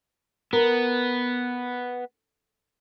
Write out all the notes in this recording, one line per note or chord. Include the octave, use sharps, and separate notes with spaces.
B3 A#4